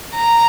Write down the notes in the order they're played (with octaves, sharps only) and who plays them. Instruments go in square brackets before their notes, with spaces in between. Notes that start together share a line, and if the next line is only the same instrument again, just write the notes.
[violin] A#5